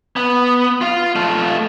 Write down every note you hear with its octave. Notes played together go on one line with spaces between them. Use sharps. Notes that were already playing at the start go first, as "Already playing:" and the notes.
B3
F4 F5
A3 F4